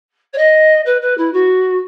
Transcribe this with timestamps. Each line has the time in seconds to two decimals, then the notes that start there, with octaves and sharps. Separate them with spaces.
0.33 C#5
0.37 D#5
0.85 B4
1.01 B4
1.17 E4
1.33 F#4